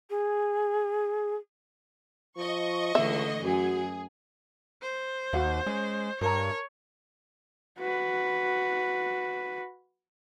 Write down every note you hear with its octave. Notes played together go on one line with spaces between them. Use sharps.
G#4
F3 D#5 C#6
C#2 D3 E3 A3 E5
F#2 F#4 G#4
C5
D#2 F#4 F5 F#5
G#3 C#4
G2 A#4 C#5 A5 A#5
F#4 B4